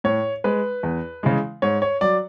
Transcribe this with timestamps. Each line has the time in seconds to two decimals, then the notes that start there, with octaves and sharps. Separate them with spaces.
0.04 A2 C#5
0.44 G#3 B4
0.83 E2
1.23 C#3 E3 G#3
1.62 G#2 C#5
1.82 C#5
2.01 F#3 D5